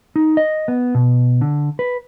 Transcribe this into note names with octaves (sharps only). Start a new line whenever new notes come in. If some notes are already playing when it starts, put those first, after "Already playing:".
D#4
D#5
B3
B2
D3
B4